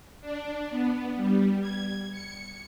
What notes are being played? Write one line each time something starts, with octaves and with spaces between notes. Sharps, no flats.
D4
B3
G3
G#6
C#7